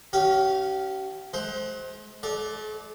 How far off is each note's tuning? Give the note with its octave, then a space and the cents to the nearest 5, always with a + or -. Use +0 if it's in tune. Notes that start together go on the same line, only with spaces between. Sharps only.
C#4 +10 G4 -40 F5 +0
G#3 +40 C5 +0
A3 -45 D5 +0